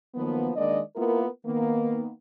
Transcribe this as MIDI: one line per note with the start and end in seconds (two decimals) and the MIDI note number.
0.15 0.51 51
0.15 0.51 53
0.15 0.51 54
0.15 0.51 58
0.15 0.51 59
0.56 0.81 51
0.56 0.81 56
0.56 0.81 58
0.56 0.81 62
0.56 0.81 74
0.56 0.81 75
0.96 1.26 58
0.96 1.26 59
0.96 1.26 64
0.96 1.26 65
0.96 1.26 70
1.46 2.13 51
1.46 2.13 58
1.46 2.13 59